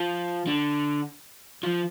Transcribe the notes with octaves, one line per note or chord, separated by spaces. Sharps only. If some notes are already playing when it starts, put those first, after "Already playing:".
Already playing: F3
D3
F3